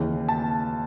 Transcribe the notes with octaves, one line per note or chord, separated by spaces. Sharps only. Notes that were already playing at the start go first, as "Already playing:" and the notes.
Already playing: D#2 C#3 E3
A5